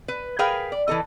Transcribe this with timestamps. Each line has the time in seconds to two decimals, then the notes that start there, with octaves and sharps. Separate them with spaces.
0.08 B4
0.39 G#4 A#4 B4 F5 G5 G#5
0.72 D5
0.88 E3 F3 A4 D#5